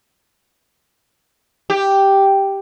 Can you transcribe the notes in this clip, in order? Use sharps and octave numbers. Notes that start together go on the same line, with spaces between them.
G4